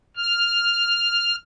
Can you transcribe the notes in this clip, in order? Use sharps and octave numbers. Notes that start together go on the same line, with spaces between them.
F6